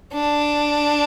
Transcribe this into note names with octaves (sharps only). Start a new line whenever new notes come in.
D4